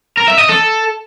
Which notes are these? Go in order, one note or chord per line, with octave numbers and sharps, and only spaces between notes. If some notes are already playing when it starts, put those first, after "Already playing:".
A#4
E5
D#5
A4